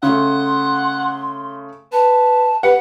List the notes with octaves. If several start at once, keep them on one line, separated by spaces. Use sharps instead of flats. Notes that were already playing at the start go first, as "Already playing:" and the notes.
C#3 A3 F#5 C6
B4 A5
G4 B4 F#5